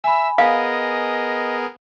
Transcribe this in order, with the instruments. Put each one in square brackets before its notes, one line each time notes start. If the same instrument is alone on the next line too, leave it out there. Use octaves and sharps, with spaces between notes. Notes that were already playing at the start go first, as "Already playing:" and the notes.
[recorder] E5 [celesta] G#5 B5 [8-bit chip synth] E6
[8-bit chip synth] B3 G#4 A#4 [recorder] D#5 [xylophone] F5